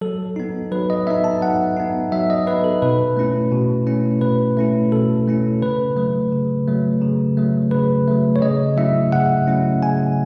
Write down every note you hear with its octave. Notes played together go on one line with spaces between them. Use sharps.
F#3 A4
B3 D#4
F#3 B4
D#5
B3 D#4 E5
A5
F#3 F#5
B3 D#4
F#3 E5
D#5
B3 D#4 B4
A4
B2 B4
A3 C#4 E4
B2
A3 C#4 E4
B2 B4
A3 C#4 E4
B2 A4
A3 C#4 E4
C#3 B4
F#3 A3
C#3
F#3 A3
C#3
F#3 A3
C#3 B4
F#3 A3
C#5
C#3 D#5
F#3 A3 C#4 E4 E5
C#3 F#5
F#3 A3 C#4 E4
C#3 G#5